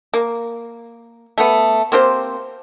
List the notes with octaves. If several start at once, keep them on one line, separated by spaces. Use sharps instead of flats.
A#3
A3 B3
A#3 C4 G4 C5